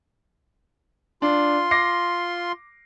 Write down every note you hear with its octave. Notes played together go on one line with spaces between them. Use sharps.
D4 F4 C6
D6 A#6 C7